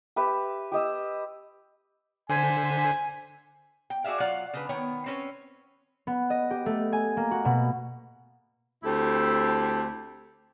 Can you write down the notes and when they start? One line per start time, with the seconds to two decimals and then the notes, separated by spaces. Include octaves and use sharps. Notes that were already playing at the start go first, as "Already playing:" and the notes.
0.16 G4 B4 E5
0.72 G4 D#5 E6
2.29 D3 C5 G#5 B6
3.90 G5
4.04 F#4 G#4 D5 E5 F5
4.20 F#3 F4 D5 F5 F#5
4.53 C#3 D4 B4
4.69 D#3 B3 C#5 G5
5.06 C4 C#4 B4 C#5
6.07 B3
6.30 D#5
6.51 G4
6.66 A3
6.93 G#5
7.17 A#3
7.31 F#4
7.45 B2
8.84 D2 A3 C4 E4 G4 A4